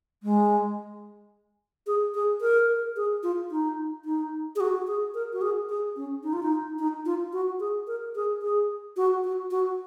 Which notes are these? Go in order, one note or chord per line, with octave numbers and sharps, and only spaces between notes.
G#3
G#4
G#4
A#4
G#4
F4
D#4
D#4
G#4
F#4
G#4
A#4
F#4
G#4
G#4
C#4
D#4
F4
D#4
D#4
F4
F#4
G#4
A#4
G#4
G#4
F#4
F#4
F#4